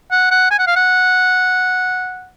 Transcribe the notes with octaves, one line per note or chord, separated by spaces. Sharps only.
F#5
F#5
G#5
F#5
F5
F#5